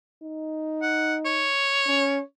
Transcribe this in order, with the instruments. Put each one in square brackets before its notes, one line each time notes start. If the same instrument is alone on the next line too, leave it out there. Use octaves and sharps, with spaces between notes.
[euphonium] D#4
[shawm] F#5
C#5
[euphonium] C#4